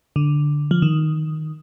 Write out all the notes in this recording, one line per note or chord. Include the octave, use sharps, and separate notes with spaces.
D3
F3
D#3